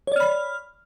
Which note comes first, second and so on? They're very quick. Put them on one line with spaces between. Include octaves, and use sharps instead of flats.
C#5 D5 F6 B5